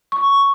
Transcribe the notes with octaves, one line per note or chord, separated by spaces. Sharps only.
C#6